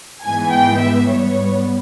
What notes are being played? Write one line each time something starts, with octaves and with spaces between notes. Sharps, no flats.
G#2 E3 G#3 B3 G#5
G5
E5
G#2 G3 B3 C#5